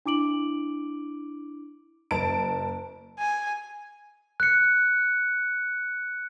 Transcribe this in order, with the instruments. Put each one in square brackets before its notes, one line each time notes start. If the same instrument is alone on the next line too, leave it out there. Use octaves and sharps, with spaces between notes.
[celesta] D4 E4 D6 D7 F#7
[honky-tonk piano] F#1 A5 D7
[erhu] G#5
[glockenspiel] F#6 C#7